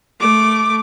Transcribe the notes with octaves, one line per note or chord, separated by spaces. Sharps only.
A3 D6